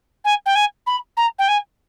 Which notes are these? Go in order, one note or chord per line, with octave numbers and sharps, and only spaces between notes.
G#5
G5
G#5
B5
A#5
G5
G#5